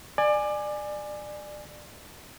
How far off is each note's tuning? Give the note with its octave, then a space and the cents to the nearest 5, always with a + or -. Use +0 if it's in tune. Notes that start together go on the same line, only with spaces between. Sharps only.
D5 +25 G#5 +0